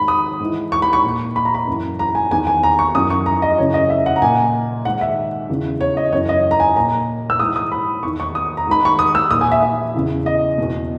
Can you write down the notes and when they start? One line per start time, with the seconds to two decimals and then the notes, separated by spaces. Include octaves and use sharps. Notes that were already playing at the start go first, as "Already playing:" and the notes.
Already playing: G#2 D#3 B5
0.08 D#6
0.40 G#2 E3
0.72 C#6
0.82 B5
0.93 C#6
1.04 A#2
1.36 B5
1.45 A#5
1.54 B5
1.67 F#2 E3
1.99 A#5
2.15 G#5
2.31 E2 D#3 G#5
2.47 G#5
2.63 A#5
2.79 C#6
2.95 F#2 E3 D#6
3.10 C#6
3.26 A#5
3.42 D#5
3.58 F#2 C#3 E3 C#5
3.74 D#5
3.90 E5
4.06 F#5
4.16 A#5
4.22 A#2 G#5
4.85 G#2 D#3 F#5
5.01 E5
5.49 E2 C#3 E3
5.81 C#5
5.97 D#5
6.12 F#2 C#5
6.16 E3
6.29 D#5
6.51 A#5
6.60 G#5
6.76 A#2 A#5
7.30 E6
7.40 G#2 E3 D#6
7.56 D#6
7.72 B5
8.03 E2 D#3 C#6
8.20 C#6
8.35 D#6
8.57 A#5
8.68 G#2 D#3 B5
8.85 C#6
8.99 D#6
9.15 E6
9.31 A#2 D#6
9.41 G#5
9.52 E5
9.63 E5
9.94 E2 C#3 E3
10.26 D#5
10.58 E2 B2